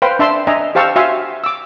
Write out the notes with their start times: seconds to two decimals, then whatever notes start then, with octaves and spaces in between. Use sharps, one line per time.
0.02 B4 C5 F5 G5 C6
0.19 D4 E5 A5 C6
0.47 D4 D#5 E5 G#5 A#5
0.75 G4 C5 F5 A5 C#6 E6
0.96 F#4 E5 F5 G#5 C6
1.44 D6 E6